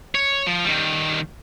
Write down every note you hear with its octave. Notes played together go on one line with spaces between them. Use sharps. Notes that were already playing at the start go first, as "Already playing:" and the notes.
C#5
F3
D#3 G3